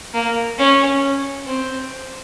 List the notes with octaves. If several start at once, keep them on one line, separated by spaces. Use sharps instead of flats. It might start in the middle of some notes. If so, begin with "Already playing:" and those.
A#3
C#4
C4